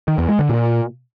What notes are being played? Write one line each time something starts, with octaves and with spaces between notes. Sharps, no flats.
D#3
E2
G#3
D3
A#2